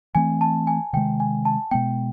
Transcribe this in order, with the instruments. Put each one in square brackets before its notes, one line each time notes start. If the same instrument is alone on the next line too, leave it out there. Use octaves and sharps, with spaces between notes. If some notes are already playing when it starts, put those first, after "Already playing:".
[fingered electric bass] E3 A3 C4 [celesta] G#5
[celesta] A5
G#5
[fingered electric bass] C3 D#3 G#3 [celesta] G5
[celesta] G#5
A5
[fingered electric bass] B2 G#3 B3 [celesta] G5